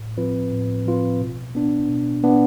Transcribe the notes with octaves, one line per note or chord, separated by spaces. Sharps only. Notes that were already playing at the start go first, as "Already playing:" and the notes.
Already playing: A2
F3 C4 F4 B4
A2
F3 C4 F4 B4
B2
B3 D4
B2
B3 D4